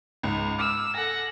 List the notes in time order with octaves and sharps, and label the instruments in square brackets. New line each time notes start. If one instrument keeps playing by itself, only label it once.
[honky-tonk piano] C#2 G#2
[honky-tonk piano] D6 F6 [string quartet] E6
[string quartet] A4 F#5 A#6 [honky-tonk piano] G#5